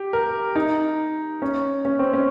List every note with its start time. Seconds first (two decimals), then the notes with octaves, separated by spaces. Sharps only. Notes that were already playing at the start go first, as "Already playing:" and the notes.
Already playing: G4
0.13 A#4
0.55 D#4
1.42 C#4
1.85 C#4
1.99 C4
2.13 C#4